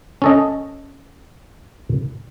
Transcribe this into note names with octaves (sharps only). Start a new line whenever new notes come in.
C#4 A4 D#5